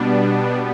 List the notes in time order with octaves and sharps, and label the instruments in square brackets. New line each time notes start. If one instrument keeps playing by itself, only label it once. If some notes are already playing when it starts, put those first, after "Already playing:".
Already playing: [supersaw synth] B2 G3 B3 D4